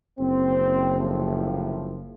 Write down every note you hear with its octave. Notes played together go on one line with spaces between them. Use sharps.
F#1 C4
A2 C3 F3